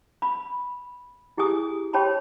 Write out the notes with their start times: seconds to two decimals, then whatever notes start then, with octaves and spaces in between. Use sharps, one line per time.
0.22 B5
1.37 E4 G4 G#4 G#5 D#6
1.93 G4 C#5 G5 A5 B5 C6